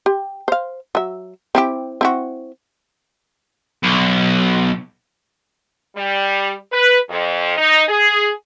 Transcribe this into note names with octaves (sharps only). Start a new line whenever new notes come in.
G4
C5 F5
F#3 E5
C4 E4 G4
C4 E4 F#4
B1
G3
B4
F2
D#4
G#4